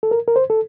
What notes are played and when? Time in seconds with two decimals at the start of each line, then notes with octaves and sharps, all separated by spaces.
0.03 A4
0.11 A#4
0.28 A#4
0.36 C5
0.50 A4